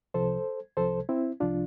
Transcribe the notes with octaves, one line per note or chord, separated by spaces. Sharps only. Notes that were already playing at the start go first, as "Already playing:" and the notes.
C2 C3 F3 A4 C5
C2 C3 F3 A4 C5
C4 E4
C2 C3 F3 D4 F4